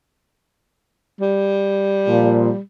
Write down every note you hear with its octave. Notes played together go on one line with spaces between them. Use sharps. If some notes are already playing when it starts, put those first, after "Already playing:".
G3
A#2 F3